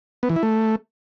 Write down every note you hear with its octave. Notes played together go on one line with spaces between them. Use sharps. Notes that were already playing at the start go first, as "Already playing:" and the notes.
B3
E3
E4
A3